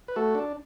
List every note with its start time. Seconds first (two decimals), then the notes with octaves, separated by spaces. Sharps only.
0.08 B4
0.16 A3 F#4 A4
0.35 D4